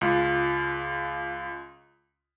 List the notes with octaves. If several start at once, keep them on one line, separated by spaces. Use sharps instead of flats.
C#2 F4